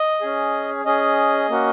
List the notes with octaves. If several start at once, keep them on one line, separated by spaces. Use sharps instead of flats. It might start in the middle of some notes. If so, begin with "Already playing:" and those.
Already playing: D#5
C#4 G#4
C#4 G#4 D#5
A#3 C#4 F#4